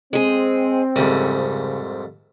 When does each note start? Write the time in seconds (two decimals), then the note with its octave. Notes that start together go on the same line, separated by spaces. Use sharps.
0.13 G#3 C4 G#4
0.96 C2 F2 G#2 C#3